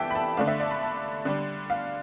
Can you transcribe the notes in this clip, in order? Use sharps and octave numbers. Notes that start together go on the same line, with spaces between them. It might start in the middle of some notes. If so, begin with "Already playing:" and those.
Already playing: E3 B3 D4 G4 A4 E5 G5
B5
A5
D3 A3 D4 F5
E5
D5
A5
B5
A5
D3 G3 D4
F5